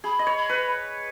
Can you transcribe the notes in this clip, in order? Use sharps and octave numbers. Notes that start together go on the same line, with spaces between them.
G#4 B5
D#5
C#5
B5
B4